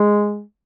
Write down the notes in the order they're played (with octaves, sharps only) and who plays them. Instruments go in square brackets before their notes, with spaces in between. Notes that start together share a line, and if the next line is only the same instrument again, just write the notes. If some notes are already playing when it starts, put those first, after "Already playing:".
Already playing: [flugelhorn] G#3